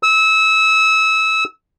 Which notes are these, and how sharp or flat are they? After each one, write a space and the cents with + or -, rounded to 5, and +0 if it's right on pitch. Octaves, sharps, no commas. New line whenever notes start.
E6 -25